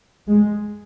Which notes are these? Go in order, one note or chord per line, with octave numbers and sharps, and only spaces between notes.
G#3